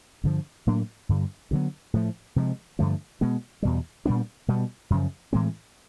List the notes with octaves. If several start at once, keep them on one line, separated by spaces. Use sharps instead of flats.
G2 D3 F3
A2 F#3 A#3 D4
G2 D3 G3
D2 D3 F#3 B3
A2 F3 A3
C3 F3 G#3
G2 D3 F3 A3
B2 G#3 B3
E2 B2 G3
A#2 G3 B3 D4
B2 G3 B3
F#2 C#3 F3
A2 E3 G#3 C4